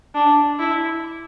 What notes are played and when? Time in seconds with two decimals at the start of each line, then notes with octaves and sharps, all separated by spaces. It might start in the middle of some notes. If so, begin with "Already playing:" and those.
0.15 D4
0.59 E4